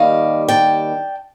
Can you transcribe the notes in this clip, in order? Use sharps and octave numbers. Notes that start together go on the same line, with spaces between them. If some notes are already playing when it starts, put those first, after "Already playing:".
Already playing: D#2 D#3 G3 D#5 F5
G5 A5